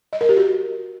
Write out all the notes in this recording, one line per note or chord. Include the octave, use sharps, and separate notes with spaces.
D#5
A#4
G4
F#4